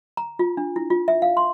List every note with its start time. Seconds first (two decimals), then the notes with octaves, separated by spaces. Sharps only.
0.17 A#5
0.39 F4
0.57 D4
0.76 E4
0.90 F4
1.08 E5
1.22 F5
1.37 C6